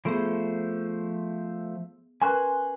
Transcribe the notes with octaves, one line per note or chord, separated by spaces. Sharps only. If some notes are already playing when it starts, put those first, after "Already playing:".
F3 A3 B3 G#4 C5
C#4 A#4 B4 G#5 C6 F#6